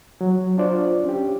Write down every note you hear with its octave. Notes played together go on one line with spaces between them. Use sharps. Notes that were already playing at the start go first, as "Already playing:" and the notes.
F#3
D4 F4 C5 D5
C#4 G4